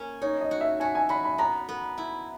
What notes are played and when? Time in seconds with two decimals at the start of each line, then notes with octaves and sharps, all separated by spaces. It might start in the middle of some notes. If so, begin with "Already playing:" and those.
Already playing: A#3 C#4
0.21 D#4 C#5
0.41 D#5
0.51 F#4
0.61 E5
0.80 F#4 G#5
0.95 G#5
1.09 F#4 B5
1.24 B5
1.38 B3 A#5
1.69 B3
1.98 E4